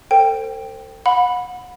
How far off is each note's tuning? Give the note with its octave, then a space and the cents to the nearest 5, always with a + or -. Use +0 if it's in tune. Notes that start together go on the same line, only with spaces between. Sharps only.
A4 +40 C5 +0 G5 +0
F#5 -35 B5 +0